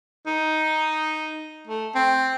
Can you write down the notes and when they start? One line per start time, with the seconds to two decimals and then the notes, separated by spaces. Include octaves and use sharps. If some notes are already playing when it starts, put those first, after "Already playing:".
0.27 D#4
1.67 A3
1.95 C4